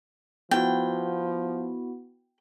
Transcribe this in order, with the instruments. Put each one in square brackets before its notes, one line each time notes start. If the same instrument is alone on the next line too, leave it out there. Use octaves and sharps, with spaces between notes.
[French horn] F3 [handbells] B3 E4 F#4 [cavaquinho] G5